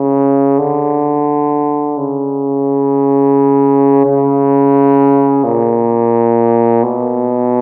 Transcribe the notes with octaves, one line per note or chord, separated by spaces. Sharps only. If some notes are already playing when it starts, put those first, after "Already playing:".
Already playing: C#3
D3
C#3
C#3
A#2
B2